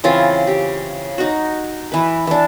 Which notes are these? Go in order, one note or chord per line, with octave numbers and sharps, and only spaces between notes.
C#3 E3 C4 F4
G4
D#4 F#4
E3 B4
E3 D4